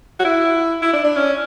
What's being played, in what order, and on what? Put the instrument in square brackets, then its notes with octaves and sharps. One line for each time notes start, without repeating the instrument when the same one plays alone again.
[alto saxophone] F#4
E4
E4
D4
D4
C#4